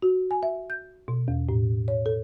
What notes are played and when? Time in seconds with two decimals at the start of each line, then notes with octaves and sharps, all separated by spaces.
0.02 F#4
0.31 G#5
0.43 E5
0.70 G6
1.08 B2
1.28 E2
1.49 A2
1.88 C#5
2.06 A4